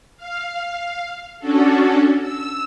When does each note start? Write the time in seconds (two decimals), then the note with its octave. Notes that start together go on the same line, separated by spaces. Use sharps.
0.17 F5
1.39 C#4 D4 F#4 A4
2.21 E6